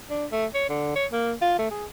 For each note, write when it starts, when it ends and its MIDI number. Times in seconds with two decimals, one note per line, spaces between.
0.10 0.26 62
0.32 0.46 57
0.54 0.64 73
0.69 0.91 50
0.96 1.06 73
1.12 1.34 58
1.41 1.55 65
1.58 1.69 57
1.71 1.86 68